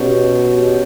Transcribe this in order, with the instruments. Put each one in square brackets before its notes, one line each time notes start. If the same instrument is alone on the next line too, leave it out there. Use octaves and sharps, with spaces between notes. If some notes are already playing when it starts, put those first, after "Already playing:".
Already playing: [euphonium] B2 [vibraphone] C#4 G4 C#5
[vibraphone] C#4 G4 C#5